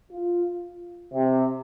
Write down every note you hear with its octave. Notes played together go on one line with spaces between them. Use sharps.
F4
C3